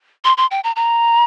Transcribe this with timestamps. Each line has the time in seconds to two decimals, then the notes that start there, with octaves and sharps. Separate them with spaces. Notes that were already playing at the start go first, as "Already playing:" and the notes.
0.24 C6
0.37 C6
0.51 G5
0.64 A#5
0.76 A#5